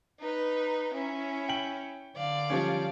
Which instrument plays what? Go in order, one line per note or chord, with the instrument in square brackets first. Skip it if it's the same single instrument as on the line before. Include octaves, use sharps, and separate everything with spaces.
[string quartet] D#4 B4
C#4 E4
[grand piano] G5 F#7
[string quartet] D3 D5 F5
[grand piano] F3 G3 C#4